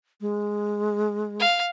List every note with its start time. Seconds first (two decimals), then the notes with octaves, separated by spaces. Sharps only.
0.21 G#3
1.40 F5